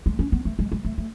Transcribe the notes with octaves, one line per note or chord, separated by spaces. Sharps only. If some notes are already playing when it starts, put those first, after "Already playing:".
G#3
C#4
B3
A3
G#3
G#3
A3
A3